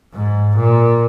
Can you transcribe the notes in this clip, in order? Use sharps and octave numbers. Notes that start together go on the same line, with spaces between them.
G#2
A#2